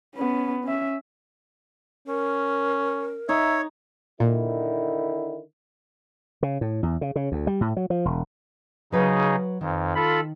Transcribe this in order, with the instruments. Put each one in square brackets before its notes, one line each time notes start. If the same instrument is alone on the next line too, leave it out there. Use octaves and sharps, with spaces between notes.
[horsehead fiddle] B3 C#4
C#4 E5
[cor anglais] C#4 [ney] A#4
[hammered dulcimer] D#4 [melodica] C#5 [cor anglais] E5
[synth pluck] A#2 [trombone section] D3 D#3 E4
[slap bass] C#3
A2
E2
C#3
C#3
D2
G3
A2
F#3
F3
E1
[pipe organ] C#3 D#4 G#4 [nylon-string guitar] F#3 B4
[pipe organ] F2 [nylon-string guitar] D#3
[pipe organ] F4 A4 B5